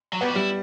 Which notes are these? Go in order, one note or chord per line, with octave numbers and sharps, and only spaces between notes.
F#3
G3 B3
F#4
G3 E4